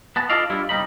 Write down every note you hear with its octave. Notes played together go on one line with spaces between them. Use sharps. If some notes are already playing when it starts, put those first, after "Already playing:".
B3 A5
E4 F4 A4 D5 D#5 F5
G2 G3 E4 F4
C2 F#2 G3 D#4 B5